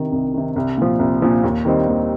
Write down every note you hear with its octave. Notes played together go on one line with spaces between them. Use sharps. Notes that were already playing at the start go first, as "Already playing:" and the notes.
Already playing: C3 D#3
C2
C3 D#3
C2
A#2 F3
C2
A#2 F3
D#2
D#3 G3 C4 D#4
D#2